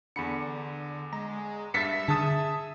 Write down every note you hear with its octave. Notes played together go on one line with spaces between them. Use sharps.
E2 D3 B5 C#7
G#3 A#5
G2 E5 A6 B6 C#7
D3 G#4 A5 D#6 A6